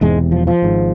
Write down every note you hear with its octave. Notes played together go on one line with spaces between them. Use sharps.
E1 E2 G#2 C3 G#3
F3
F3
G#1 G#2